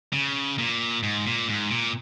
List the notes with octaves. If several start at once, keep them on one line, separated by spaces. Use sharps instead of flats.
C#3
A#2
G#2
A#2
G#2
A#2